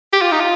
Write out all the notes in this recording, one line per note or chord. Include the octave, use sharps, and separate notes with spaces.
G4
F4
D#4
F4